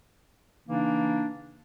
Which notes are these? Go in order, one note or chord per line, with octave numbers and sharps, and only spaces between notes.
C#3 E3 A#3 D4 D#4